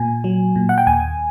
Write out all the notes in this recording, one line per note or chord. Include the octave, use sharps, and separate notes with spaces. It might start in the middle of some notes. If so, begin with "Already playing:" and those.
Already playing: A#2 G#5
F#3
A#2
F#5
G5
D#2 G#5